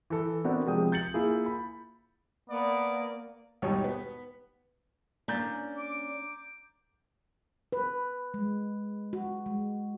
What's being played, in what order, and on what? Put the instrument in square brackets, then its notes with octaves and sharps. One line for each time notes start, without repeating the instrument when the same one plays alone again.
[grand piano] E3 A4
B3 C4 D4 F#4 A#4
C3 F3 G#3 G5 D#6
G6 A6 C#7 F#7
A#3 E4 F4 G#4
B5
[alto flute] A#3 [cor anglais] B3 [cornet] D5
[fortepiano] D#2 G#2 B2 G3 D#4 C#5
B3
[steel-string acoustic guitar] A#3 C#4 D4 [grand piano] A#5 G6 A6
[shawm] D6
[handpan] B4
G#3
F#4
G#3